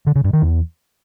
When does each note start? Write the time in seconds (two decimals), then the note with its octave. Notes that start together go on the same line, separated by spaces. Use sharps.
0.07 D3
0.15 C#3
0.24 G2
0.33 D#3
0.42 E2